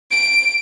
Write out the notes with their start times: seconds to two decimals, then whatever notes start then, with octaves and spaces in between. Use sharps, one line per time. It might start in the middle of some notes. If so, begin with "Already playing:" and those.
0.11 D7